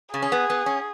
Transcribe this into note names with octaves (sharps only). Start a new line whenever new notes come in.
C#3 G#4
C#4
B3
B3
C#4